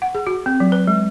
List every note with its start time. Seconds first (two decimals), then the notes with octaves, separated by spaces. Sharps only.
0.02 F#5
0.15 G#4
0.27 F#4
0.46 C4
0.60 F#3
0.72 B4
0.87 G#3